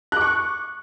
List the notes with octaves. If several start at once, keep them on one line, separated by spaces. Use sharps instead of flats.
C#6 D6 F#6